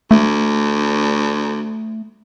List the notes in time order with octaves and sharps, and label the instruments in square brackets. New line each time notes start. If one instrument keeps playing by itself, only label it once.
[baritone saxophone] D2 [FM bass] A3